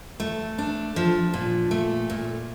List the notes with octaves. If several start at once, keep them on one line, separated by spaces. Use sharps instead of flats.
A3
D4
F3
A#2
A3
A#2